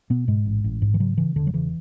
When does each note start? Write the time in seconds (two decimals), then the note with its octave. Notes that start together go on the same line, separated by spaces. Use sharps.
0.10 B2 B3
0.28 G#2 G#3
0.46 A1
0.64 A1
0.82 G#2
0.94 E3
1.00 C#3 F#3
1.18 C#3 E3
1.36 E1 D3
1.47 F#3
1.54 C#3 E3